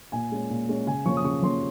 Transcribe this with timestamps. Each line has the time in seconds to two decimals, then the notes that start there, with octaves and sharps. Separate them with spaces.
0.12 A#2 G#5
0.32 G#3 C#4
0.50 A#2
0.69 G#3 C#4
0.87 C#3 G#5
1.05 F3 A#3 C#4 C#6
1.17 D#6
1.24 C#3 C#6
1.42 F3 A#3 C#4 C6